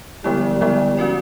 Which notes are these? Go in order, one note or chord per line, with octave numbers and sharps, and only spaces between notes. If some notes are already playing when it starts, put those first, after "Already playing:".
D3 F3 G3 G#3 B3 E4
D3 F3 G#3 B3 E4
C#4 F#4 A#4 D5